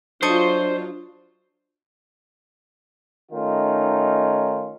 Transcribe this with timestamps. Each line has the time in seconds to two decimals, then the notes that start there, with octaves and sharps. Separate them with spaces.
0.23 F#3 D4 F4 A4 C5 D#5 C#6
3.32 D#3 A3 C#4 D#4 F4